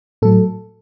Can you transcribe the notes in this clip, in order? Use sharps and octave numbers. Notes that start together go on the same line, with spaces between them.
A2 F#3 A4